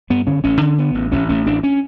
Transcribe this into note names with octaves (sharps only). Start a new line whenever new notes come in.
G2 B3
D3 C#4
A1 C#4
D3
D3 B3
A1
A1 C#4
A1 C#4
A1 D4
C#4